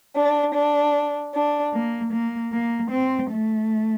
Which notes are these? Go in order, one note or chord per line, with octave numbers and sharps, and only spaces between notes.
D4
D4
D4
A#3
A#3
A#3
C4
A3